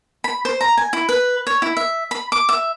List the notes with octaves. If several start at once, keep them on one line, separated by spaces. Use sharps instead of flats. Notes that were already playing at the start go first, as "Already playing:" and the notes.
B5
C5
A#5
G#5
E4
B4
C#5
E4
E5
B5
D6
E5